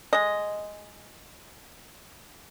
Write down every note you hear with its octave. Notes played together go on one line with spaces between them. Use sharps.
G#3 D#5